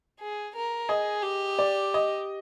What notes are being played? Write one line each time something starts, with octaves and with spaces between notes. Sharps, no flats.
G#4
A#4
G#4 D#5
G4
D5
D#5